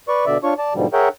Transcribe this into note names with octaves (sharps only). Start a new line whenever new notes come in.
B4 D5 C#6
B2 D3 D5 E5
D4 F4 C#5 C#6
D5 A5
G#2 B2 D3 F3 G3
G#4 A#4 C#5 E5 F#5 G5